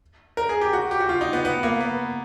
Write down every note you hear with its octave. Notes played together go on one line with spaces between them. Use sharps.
A#4
G#4
G4
F#4
G4
F#4
F4
D#4
B3
B3
A#3
B3